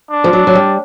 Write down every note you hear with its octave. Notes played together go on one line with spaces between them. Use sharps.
D4
F3
F#3
F#3
G3